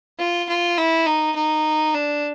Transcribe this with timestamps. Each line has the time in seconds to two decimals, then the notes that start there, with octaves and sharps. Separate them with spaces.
0.19 F4
0.48 F4
0.77 E4
1.06 D#4
1.35 D#4
1.94 D4